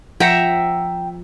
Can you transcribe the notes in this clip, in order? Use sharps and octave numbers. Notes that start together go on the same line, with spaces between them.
F3 E5 F#5 G5 A#5 C#7